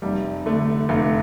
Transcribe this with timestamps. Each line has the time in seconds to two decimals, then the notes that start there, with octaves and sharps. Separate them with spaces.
0.02 F1 G3
0.46 D3 A3
0.89 F1 A3